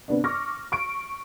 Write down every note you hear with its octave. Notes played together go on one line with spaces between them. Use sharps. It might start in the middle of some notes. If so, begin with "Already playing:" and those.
C3 B3 D4
C#6 D6 F6 A#6
C#6 D7